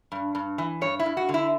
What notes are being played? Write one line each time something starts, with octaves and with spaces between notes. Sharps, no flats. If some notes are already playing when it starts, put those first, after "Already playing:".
G2
G2
E3
G2 C#5
E4
G2
F#4
D3
E4